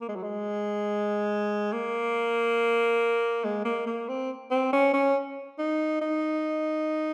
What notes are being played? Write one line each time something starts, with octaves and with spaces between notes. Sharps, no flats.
A#3
G#3
F#3
G#3
A#3
G#3
A#3
A#3
C4
C4
C#4
C#4
D#4
D#4